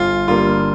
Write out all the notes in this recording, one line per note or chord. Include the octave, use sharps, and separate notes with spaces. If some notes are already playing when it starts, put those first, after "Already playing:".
Already playing: G1 F4
G2 D3 G3 A#3 F4